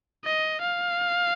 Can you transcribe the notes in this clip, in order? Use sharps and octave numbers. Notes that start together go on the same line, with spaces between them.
D#5
F5